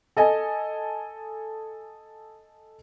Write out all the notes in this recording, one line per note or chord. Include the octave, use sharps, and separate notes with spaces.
A4 D#5 G#5